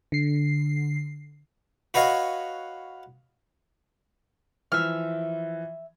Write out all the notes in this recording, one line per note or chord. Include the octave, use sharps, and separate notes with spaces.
D3 C7
F#4 B4 C#5 D#5 F5
E3 F3 E5 F6